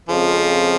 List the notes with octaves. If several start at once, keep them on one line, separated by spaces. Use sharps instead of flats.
F2 C#3 F3 G#3 C4